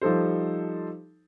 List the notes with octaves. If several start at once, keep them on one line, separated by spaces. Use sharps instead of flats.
F3 G3 D#4 A4 C5